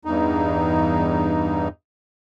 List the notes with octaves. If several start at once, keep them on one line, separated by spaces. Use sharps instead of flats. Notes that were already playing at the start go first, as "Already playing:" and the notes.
E2 G2 D#4